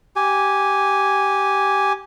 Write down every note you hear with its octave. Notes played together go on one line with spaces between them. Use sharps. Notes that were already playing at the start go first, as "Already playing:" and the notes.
G4 G#5